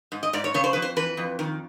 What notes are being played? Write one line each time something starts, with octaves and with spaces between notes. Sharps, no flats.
G#2
D#5
G#2 D5
C#5
C#3 C#5
C5
F2 B4
C5
E3 B4
F2
D#3